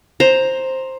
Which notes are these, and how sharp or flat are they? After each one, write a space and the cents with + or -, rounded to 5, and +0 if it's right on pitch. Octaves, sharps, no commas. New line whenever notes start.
C5 +10 A#5 +0